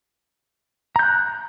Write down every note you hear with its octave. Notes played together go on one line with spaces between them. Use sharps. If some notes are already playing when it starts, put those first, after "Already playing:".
A#5 F#6 G6